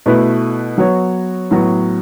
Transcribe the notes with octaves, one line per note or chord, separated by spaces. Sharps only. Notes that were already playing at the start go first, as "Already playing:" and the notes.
B2 A3 E4 B4
F#3 B3 F#4 C#5
A2 F#3 B3 F#4